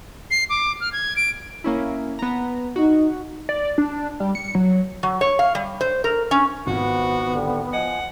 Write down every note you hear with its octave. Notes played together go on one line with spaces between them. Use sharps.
C7
D6
F6
G#6
D7
A#3 C#4 E4
B3 A#5
D#4 F#4
D5
D4
G3
C#7
F#3
F#3
C#5
F5
G3
C5
A#4
C#4
G#1 F3 B3 F#4
D3 G3
F3 D#5 F#5 G#5